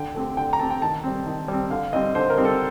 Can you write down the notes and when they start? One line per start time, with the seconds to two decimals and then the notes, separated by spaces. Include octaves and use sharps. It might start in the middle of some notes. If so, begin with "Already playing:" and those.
Already playing: D3 G5
0.15 A3 C4 G4
0.37 D3 G5
0.53 A#5
0.59 A3 C4 G4 A5
0.70 G5
0.81 D#3 A5
1.04 G3 C4
1.26 D#3
1.48 G3 C4
1.71 D3 F5
1.93 G3 C4 D#4 D#5
2.15 D3 C5
2.30 A#4
2.37 G3 C4 D#4
2.45 A4